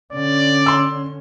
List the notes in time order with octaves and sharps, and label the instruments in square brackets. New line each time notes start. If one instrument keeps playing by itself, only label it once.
[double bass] D3 C#4 [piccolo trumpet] D5
[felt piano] C6 E6